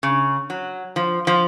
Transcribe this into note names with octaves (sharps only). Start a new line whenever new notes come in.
C#3
F#3
F3
F3